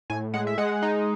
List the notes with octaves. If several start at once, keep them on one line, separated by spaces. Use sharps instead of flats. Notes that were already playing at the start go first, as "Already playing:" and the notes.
A2 G#5
G#3 F#5
E5
G#3 F#5
D#4